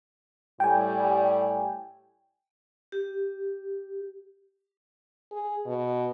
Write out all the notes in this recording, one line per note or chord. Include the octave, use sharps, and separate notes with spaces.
A2 G3 G5 G#5
G4
G#4
B2